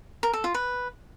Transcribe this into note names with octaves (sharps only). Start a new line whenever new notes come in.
A#4
A4
F4
B4